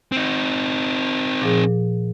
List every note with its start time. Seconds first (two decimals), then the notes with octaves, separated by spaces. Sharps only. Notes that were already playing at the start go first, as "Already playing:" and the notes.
0.12 C4 D#4
1.42 A#2 F3 G#4